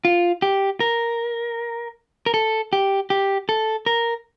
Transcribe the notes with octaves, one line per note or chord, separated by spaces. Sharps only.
F4
G4
A#4
A#4
A4
G4
G4
A4
A#4